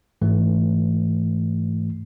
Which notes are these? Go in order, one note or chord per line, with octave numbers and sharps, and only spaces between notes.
G#2 E3 A3